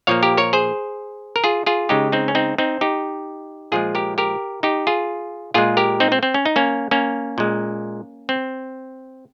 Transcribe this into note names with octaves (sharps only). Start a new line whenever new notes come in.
A#2 F3 A#3 C#5 F5
G4 A#4
A#4 C#5
G#4 C5
A#4
F4 G#4
F4 G#4
C#3 G#3 D#4 G4
C4 D#4
C#4
C4 D#4
C4 D#4
D#4 G4
A#2 F3 G#3 F4 G#4
G4 A#4
G4 A#4
D#4 G4
F4 G#4
A#2 G#3 F4 G#4
G4 A#4
C4 D#4
C4
C4
C#4
D#4
A#3 C#4
A#3 C#4
A#2 G#3
C4